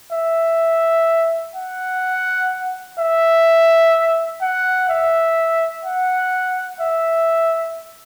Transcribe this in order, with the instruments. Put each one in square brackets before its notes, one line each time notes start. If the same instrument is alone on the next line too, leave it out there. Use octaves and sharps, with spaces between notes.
[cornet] E5
F#5
E5
F#5
E5
F#5
E5